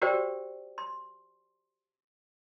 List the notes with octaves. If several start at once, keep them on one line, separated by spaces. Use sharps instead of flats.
F#4 G4 A#4 C5 D5 G5
C6